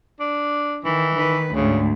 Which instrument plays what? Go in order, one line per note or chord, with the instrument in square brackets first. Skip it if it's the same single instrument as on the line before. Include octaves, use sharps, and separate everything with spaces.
[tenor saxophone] D4
[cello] D#3 [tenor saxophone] E3
[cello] D#3 B4
[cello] D2 G#2 [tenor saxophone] C#3